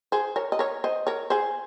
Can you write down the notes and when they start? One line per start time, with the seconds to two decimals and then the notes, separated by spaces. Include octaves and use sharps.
0.12 G#4 C5
0.36 A#4 C#5
0.52 D#5
0.59 A#4 C#5
0.84 C5 D#5
1.07 A#4 C#5
1.30 G#4 C5